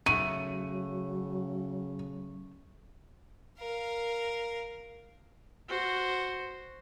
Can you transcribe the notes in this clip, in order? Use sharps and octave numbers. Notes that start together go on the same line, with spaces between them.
C#3 F#3 A3 D#7
A#4 F5
F#4 C5